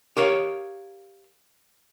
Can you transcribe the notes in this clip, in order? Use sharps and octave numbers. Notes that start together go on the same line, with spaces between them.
G4 A#4 C#5 F5